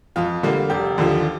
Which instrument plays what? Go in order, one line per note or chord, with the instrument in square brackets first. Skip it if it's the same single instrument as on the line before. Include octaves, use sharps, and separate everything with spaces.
[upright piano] F2 F4
D3 G3 A#3 F4
F1 G4
D#2 D3 F3